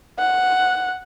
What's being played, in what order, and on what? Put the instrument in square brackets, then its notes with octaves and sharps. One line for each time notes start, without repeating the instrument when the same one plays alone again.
[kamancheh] F#5